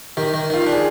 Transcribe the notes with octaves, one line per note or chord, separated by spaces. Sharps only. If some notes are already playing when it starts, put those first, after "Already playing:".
D#3 G4
D#3
D#3 F4
D4 G4
G#4